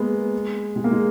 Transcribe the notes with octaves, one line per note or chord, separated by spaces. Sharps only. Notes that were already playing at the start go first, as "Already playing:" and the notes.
Already playing: G#3 A#3 B3
G#3
A#3
G#3